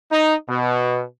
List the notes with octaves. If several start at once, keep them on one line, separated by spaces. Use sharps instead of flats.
D#4
B2